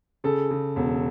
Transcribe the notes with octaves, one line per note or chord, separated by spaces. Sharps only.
C#3 A4
C#3
E1